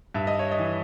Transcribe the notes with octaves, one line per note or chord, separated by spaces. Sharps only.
G2 E5
D#5
C#5
D#5
E3